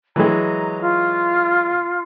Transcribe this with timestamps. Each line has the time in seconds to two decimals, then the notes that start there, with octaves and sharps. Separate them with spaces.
0.16 E3 F#3 G#3 A#5
0.81 F4